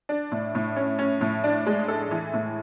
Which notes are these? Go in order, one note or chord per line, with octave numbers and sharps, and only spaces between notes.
D4
A2
A2
C#4
C#4
A2
D4
G#3
A4
E3
A2